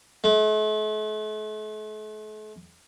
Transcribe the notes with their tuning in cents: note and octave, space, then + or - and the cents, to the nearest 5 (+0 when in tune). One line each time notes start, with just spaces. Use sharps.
A3 -45